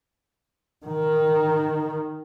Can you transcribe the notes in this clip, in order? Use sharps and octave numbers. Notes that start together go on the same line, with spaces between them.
D#3